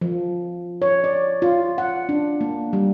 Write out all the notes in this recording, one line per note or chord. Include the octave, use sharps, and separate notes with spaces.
F3
C#5
D5
F4
F#5
D4
A#3
G3